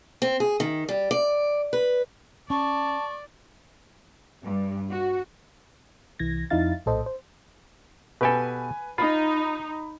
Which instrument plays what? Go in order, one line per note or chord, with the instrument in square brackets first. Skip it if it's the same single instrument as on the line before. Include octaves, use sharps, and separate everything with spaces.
[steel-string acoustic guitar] C4
G#4
D#3
G3
D5
B4
[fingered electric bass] C#4 [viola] D5 [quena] A5 [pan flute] C#6
[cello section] G2
F#4
[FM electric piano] C2 E3 G#6 A#6
F2 F3 D#4 E4 F5 A6
A#1 A2 A4 C5 D#5
C5
[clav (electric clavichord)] B2 G4 A4 [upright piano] B4 G#5
[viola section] D#4 [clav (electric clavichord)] F4 [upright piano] B5